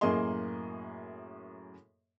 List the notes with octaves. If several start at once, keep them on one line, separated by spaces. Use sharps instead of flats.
F#2 A2 A#3 G#4 D#5 C6